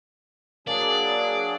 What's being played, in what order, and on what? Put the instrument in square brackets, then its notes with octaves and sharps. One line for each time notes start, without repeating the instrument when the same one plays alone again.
[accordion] F#3 D4 G#4 [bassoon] A#3 [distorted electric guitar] D5